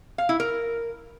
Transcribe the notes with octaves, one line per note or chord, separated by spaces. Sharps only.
F5
E4
A#4